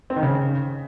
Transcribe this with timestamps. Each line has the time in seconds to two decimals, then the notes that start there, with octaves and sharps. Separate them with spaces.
0.10 C4
0.16 D#3
0.23 C#3